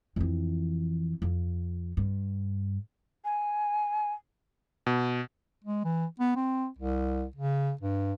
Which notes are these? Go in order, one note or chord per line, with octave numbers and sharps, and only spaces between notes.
F2 E3
F2
G2
G#5
B2
G#3
E3
B3
C4
C2
C#3
G2